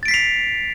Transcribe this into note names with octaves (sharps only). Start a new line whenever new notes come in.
A6 B6 C7 D7 F7